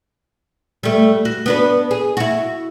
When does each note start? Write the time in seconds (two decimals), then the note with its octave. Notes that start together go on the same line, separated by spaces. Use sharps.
0.83 G3 A3
1.25 F#4
1.46 B3 D4 B4
1.91 G#4
2.17 E4 F#4